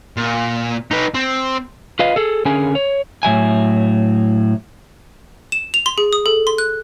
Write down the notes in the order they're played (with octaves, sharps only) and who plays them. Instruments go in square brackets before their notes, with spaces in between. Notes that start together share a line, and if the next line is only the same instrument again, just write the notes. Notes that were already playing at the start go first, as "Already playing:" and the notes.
[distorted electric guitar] A#2
D#4 B4
C4
[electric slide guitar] F4 B4 D#5 F5
G#4 A4
D3 C#4 G#4 A#4 G#5
C#5
A2 F#3 E5 G#5
[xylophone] E7
F7
C6
G#4
D#6
A4
C6
F#6